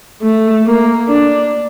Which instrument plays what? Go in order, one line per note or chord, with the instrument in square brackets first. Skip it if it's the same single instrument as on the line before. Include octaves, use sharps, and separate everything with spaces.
[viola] A3
A#3
D4